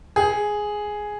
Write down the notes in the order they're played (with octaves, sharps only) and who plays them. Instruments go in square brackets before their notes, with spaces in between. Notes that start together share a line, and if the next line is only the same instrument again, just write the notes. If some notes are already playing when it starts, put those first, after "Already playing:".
[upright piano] G#4